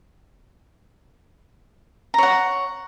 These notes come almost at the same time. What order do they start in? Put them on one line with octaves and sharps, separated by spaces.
A#5 C#5 F#5